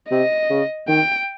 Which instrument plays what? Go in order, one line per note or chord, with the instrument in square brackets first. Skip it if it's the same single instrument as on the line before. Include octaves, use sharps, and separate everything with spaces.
[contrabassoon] C3 [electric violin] D#5
[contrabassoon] C#3
[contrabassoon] D#3 [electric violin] G5